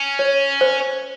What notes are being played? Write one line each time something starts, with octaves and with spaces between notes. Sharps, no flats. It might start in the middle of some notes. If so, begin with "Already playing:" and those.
Already playing: C#4
C#5
C5